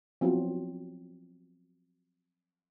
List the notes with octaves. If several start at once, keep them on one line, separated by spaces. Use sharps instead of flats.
F3 F#3 B3 C4 E4 F#4